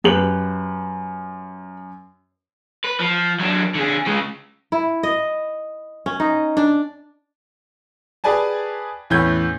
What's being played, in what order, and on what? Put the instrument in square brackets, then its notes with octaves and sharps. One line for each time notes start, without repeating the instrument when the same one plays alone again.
[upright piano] F#2 F#7 [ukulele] G4 B4
[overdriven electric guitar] B4
F3
F#3 D4
D3 G#4
C#3 G#3
[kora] E4
D#5
C#4
D#4
D4
[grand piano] G4 G#4 B4 D5 G#5 A5
E2 A2 C#4 B4 G6 G#6